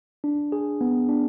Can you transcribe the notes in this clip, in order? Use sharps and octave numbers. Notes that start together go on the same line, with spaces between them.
D4
G#4
B3
D4